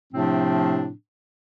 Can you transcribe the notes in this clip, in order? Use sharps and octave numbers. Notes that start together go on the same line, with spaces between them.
A2 C3 F3 A3 C4 D4